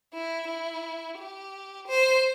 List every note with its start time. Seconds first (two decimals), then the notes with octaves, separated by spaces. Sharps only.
0.13 E4
0.48 E4
1.18 G4
1.87 C5